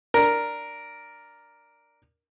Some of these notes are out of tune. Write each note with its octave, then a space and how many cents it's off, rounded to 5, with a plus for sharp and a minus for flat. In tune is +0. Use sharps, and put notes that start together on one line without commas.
D4 +0 A#4 +0